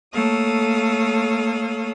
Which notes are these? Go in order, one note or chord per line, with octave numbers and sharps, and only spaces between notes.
A3 A#3 A4 C#5 F5 D#6